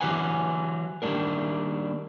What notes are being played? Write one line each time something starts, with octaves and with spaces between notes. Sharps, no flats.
E3 F#3 G4 B4 F#5 G#5
D#3 G3 A#3 C#4 D4 A#4